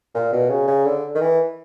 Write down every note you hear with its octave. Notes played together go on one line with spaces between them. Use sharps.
A#2
B2
C#3
C#3
D3
D#3
E3